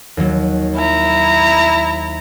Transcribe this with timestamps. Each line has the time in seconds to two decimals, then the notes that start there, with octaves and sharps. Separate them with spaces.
0.17 D#2 F#3
0.76 E4 A#5